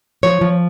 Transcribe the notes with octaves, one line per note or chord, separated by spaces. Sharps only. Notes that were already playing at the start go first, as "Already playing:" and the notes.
F3 C#5
F3